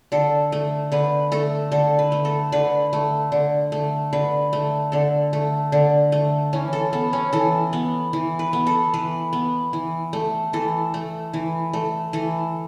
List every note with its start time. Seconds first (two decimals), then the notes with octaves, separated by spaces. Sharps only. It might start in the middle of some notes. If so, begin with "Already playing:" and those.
0.12 D3 A4
0.52 A3
0.92 D3 B4
1.32 A3 A4
1.72 D3 A4
1.99 B4
2.12 A3
2.25 A4
2.52 D3 B4
2.93 A3
3.32 D3
3.72 A3
4.13 D3 B4
4.53 A3
4.92 D3 A4
5.33 A3
5.72 D3
6.12 A3
6.53 E3 C#4
6.73 A4
6.93 B3 A4
7.13 C#4
7.33 E3 A4
7.73 B3
8.13 E3
8.39 B4
8.53 B3
8.67 A4
8.94 E3 B4
9.33 B3
9.73 E3
10.13 A3
10.53 E3 A4
10.94 A3
11.34 E3
11.73 A3
12.13 E3 A4